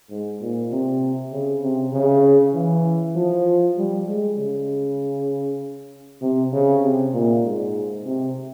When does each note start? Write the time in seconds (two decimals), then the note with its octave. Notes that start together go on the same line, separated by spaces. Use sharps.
0.10 G#2
0.41 A#2
0.71 C3
1.32 C#3
1.62 C3
1.93 C#3
2.54 E3
3.16 F3
3.78 G3
4.08 G#3
4.38 C#3
6.22 C3
6.53 C#3
6.82 C3
7.14 A#2
7.43 G#2
8.05 C3